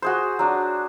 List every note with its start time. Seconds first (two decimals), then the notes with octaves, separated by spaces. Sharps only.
0.02 F#4 G#4 C5
0.39 F#3 D4